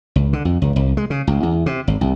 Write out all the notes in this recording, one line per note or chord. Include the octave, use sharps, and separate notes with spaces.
C#2
D3
F2
C#2
C2
G#3
C#3
C#2
E2
C3
G#1
C2